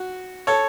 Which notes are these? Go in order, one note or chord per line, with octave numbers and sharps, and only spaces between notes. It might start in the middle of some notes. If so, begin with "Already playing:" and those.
Already playing: F#4
A4 C#5